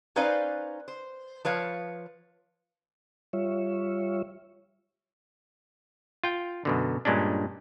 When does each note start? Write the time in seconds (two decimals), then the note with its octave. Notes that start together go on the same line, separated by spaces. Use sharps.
0.16 C#4 D#4 B4 C5 D5 F5
0.88 C5
1.45 F3 B4 C#5 F5
3.33 G3 F4 C#5 E5
6.24 F4 G5
6.65 F#2 B2 D3
7.05 G2 A#2 G#3 C#4 D4